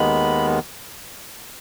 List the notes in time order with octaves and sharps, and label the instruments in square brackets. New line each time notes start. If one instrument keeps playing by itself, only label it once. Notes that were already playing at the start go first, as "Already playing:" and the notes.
Already playing: [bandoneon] D#2 D#3 G#3 B3 B5